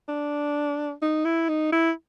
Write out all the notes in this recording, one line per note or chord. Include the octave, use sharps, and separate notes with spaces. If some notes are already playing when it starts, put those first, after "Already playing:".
D4
D#4
E4
D#4
E4